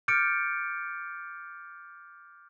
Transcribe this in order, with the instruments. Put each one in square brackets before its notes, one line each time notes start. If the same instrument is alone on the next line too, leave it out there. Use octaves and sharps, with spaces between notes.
[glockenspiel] D6 F6 G6 A6 C#7 D7